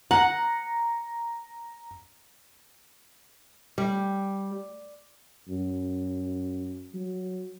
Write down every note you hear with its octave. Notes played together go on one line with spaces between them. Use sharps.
F#5 A#5
G3
F#2
F#3